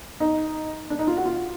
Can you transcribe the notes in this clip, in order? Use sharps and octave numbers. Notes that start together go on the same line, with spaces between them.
D#4
D4
D#4
F4
F#4
F4